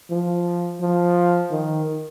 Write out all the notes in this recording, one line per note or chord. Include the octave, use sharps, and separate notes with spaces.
F3
F3
D#3